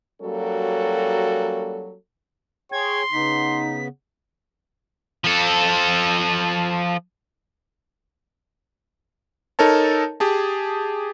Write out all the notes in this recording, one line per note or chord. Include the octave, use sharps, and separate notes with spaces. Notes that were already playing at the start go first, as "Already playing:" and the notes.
F#3 G3 A#3 C#4 F#4 A4
G#4 C#5 G5 C6 G#6
C#3 B3 D#4 B6
F3 A4
D#4 A4 A#4 C#5 A5
G4 G#4 A5